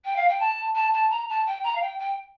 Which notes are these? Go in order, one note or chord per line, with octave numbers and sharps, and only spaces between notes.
G5
F5
G5
A5
A5
A5
A#5
A5
G5
A#5
F5
G5
G5